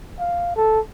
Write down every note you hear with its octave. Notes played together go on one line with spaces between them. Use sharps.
F5
A4